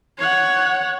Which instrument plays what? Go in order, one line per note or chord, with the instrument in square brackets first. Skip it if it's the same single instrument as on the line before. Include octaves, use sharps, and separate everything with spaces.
[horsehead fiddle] C#5 F#5